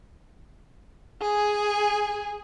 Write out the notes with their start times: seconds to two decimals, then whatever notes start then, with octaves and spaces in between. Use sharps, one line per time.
1.21 G#4 G#5